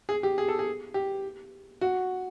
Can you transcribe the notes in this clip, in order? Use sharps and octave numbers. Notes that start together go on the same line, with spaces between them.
G#4
G4
G#4
A4
G#4
G4
F#4